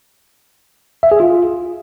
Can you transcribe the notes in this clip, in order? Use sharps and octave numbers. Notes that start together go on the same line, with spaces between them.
E5
G#4
F4